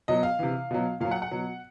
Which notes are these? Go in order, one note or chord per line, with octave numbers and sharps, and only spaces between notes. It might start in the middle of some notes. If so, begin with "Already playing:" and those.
B2 F#3 D#5
F5
C3 E3
B2 F#3
A#2 F#3 F5
F#5
F#5
B2 F#3